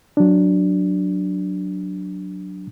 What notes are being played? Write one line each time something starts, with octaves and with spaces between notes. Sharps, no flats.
F#3 D4